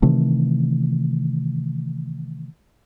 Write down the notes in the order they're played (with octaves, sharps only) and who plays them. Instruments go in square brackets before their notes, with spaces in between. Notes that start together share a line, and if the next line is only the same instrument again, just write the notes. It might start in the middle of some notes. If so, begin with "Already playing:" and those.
[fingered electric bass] C3 D#3 E3 A3